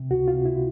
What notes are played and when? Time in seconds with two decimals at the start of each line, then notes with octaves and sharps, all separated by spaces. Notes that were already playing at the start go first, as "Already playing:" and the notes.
Already playing: C3
0.11 C#2 F#4
0.28 F4
0.34 C3
0.46 E4